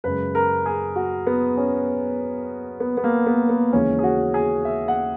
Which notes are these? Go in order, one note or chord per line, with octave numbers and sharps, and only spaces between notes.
F#2 C#3 G#3 B4
A#4
G#4
F#4
B3
C#4
B3
B3
A#3
B3
B3
D#2 C#3 E3 G#3 C#4
G#4
F#4
G#4
E5
F#5